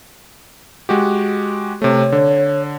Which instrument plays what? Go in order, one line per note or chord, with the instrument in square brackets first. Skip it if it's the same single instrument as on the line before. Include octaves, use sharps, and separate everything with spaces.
[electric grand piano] G#3 F#4 G4
[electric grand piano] C3 A3 [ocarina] C#5
[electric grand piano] D3